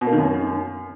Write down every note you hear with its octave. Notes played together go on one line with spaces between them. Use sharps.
B2
A#3
D#3
F#2